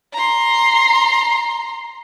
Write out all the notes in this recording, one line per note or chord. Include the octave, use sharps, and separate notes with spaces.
A#5 C6